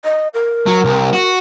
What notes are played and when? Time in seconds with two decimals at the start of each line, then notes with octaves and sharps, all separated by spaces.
0.04 D#5
0.34 A#4
0.66 F#3
0.85 C2
1.13 F#4